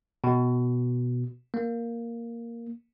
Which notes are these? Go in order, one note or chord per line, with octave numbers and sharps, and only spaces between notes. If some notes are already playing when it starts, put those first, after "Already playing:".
B2
A#3